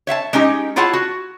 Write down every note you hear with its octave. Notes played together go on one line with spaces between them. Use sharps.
C#5 E5 F5 A5
G#3 C#4 D#4 G4
E4 F4 G#4 C#5 F#5 A5
F#4